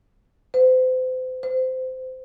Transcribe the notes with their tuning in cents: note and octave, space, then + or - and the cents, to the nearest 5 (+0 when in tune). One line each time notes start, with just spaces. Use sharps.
C5 -35
C5 -20